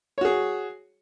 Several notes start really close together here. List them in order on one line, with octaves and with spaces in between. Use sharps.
C#5 F#4 G#4